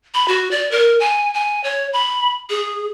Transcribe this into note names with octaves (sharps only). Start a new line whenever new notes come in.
B5
F#4
D5
A#4
G#5
G#5
C#5
B5
G#4